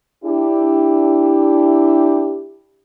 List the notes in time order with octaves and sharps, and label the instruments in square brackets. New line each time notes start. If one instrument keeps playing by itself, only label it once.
[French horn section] D4 E4 G4